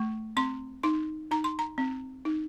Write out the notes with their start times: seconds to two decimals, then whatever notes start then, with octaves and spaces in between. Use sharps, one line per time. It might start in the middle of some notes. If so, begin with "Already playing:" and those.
Already playing: A3 C#6
0.37 C4 C6
0.83 D#4 C6
1.31 D#4 A#5
1.44 C6
1.59 A#5
1.78 C4
2.25 D#4